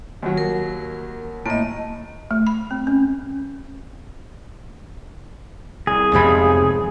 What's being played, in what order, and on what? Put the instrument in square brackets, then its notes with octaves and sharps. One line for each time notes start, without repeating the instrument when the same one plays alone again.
[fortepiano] D#2 F#3
[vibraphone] A#4
[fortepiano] A2 [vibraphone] A#3 D#5
[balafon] A3
B5
C4
C#4
[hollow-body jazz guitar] C2 [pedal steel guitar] G#4
[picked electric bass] F1 C3 [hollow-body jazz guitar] G#2 F3 B5